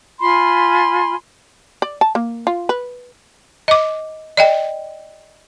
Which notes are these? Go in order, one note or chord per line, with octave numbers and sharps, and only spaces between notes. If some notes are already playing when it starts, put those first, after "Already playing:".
F4 G#5 B5 C6
D5
A5
A#3
F4
B4
D#5 D6
D5 D#5 G5